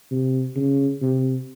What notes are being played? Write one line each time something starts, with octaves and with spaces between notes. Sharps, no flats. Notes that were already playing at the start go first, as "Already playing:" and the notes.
C3
C#3
C3